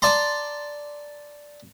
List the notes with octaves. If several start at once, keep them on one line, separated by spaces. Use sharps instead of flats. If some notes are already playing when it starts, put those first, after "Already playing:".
D5 A5 A#5 C6